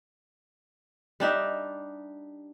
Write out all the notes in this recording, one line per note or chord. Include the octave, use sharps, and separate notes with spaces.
G3 D4 D#4 E5